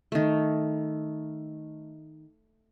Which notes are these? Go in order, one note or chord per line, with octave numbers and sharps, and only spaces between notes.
D#3 A3